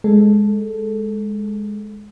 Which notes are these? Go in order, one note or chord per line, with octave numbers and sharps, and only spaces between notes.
G#3 A4